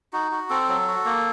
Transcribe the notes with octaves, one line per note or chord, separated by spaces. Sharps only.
D#4 F#4
F#4
C4 A4
F#3
F#4
A#3